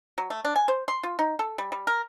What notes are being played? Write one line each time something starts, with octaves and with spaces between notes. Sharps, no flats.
F#3
A3
D4
G#5
C5
C6
F4
D#4
A4
G3
G3
A#4